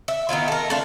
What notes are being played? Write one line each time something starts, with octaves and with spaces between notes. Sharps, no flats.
E5
D#3 B3 E4 F4
A4 A#4
A3 D4 F4